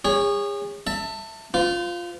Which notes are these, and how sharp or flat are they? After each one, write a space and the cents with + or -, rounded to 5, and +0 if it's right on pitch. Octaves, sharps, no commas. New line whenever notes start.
G#4 -40 C#5 +0
E5 -5 A5 +25
F4 +0 C5 -40